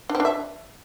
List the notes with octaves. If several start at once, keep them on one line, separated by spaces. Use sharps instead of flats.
D4
C4
D4
E5